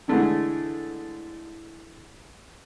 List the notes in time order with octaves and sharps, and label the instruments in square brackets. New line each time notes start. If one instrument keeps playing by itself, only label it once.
[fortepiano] D3 E3 G#3 A3 D4 E4